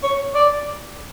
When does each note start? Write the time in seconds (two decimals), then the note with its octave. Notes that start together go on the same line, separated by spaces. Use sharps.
0.03 C#5
0.35 D5